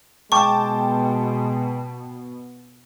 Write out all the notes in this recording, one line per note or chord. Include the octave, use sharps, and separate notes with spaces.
B2 G#3 G5 A5 C#6 D6